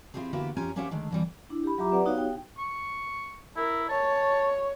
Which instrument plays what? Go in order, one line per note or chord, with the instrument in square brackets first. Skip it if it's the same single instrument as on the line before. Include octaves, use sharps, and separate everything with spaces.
[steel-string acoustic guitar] C4 D4 E4 F4 G4 G#4
D3 A#3 B3 E4 F#4 G4
F2 C#4 F4 G4 G#5 A#5
A#3 C#4 G4 C5 E5 F#5
D3 D#3 G#3 A3
F2 E3 G3
[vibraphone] D4 E4
G4 B5
F#3 F4 G4 E5 A#5 D6
C4 B4 D5 F#5
B3 D#4 F#4 G4 C#5 F5
G5
[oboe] C#6
[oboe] E4 [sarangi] A#4
[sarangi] C#5 [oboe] A5